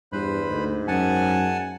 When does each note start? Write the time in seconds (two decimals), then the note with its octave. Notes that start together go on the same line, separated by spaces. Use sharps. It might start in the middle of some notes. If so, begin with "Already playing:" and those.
0.12 E2 G2 B4 C5 B5
0.50 D2 G#2
0.88 F#2 F#5 G#5 A5